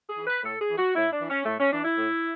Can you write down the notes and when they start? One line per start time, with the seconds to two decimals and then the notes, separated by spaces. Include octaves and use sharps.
0.09 G#4
0.18 E3
0.27 B4
0.43 A2 A4
0.61 G#4
0.70 E3
0.77 F#4
0.95 A2 E4
1.12 D4
1.21 E3
1.30 C#4
1.46 A2 A3
1.60 C#4
1.72 E3 D4
1.85 E4
1.98 A2